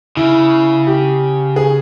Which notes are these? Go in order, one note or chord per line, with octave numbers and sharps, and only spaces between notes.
C#3 E4
G4
G#4